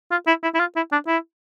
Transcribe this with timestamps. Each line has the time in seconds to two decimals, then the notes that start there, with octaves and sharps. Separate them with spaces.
0.11 F4
0.27 E4
0.43 E4
0.55 E4
0.59 F4
0.76 E4
0.92 D4
1.07 E4